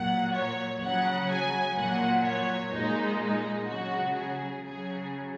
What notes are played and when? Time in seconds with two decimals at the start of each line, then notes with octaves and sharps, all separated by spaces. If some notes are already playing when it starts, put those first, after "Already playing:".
Already playing: A#2 F#3 F#5
0.34 C#5
0.82 C#3 F#3 F#5
1.30 G#5
1.77 A#2 F#3 F#5
2.25 C#5
2.72 A#2 G#3 D#4
3.21 D#4
3.68 C#3 F#3 F#4
4.16 G#4
4.64 C#3 F#3 G#4